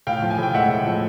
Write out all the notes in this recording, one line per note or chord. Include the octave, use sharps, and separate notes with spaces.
A2 F5 G5
F3
G#5
A2 G5
G#3 E5 F#5
A2
F3